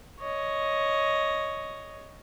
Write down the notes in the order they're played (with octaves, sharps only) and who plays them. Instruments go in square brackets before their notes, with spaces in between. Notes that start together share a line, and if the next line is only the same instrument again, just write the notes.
[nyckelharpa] C#5 D#5